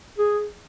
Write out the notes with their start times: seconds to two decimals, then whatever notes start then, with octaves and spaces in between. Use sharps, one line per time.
0.18 G#4